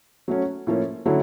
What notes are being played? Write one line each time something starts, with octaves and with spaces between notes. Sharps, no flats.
F#3 A3 C#4
A2 F3 A#3 C#4
D3 F#3 A3 C#4 E4